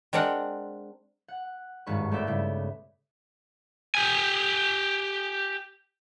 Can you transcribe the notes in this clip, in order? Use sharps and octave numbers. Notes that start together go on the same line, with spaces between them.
G#3 C4 D4 A#4 F#5
F#5
D#1 G#1 G2 G#3 B4 C#6
A3 B3 C4 D5 E5 G5
G2 C#3 E4
G4 G#5